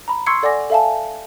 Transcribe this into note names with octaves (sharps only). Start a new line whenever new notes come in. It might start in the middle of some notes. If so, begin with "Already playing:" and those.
A#5 B5
C6 C#6 E6 G#6 C7 C#7
A4 D5 F#5 G#5 D6 A#6
A4 E5 F5 G#5 A5